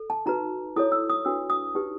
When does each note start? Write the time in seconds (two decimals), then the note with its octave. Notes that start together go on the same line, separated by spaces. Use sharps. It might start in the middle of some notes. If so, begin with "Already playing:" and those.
Already playing: A4
0.10 A5
0.26 D#4 F#4 B4 A#5
0.76 E4 A4 C#5 D#6
0.92 E6
1.10 D#6
1.25 D4 F#4 B4 E6
1.50 D#6
1.75 D#4 G4 B4